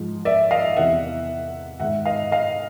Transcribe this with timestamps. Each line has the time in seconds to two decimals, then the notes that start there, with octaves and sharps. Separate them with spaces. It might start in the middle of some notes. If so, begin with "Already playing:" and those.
Already playing: G#2 F3 G#3
0.25 D5 E5
0.51 D#5 F5
0.76 E2 C3 E3 E5 F#5
1.80 G#2 D#3 G#3 E5 F#5
2.05 D#5 F5
2.31 D#5 F5